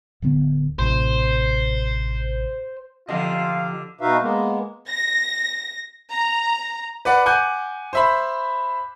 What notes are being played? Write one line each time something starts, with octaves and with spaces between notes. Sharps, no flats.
D1 D3 B3
A1 A2 C3 C5
D3 F3 F4 G4 D#5 F5
B2 D#4 F#4 B4 E5 F5
G#3 A#3 B3
A#6
A#5
B4 D5 F#5
F#5 G#5 D6 F#6 G6
C5 E5 B5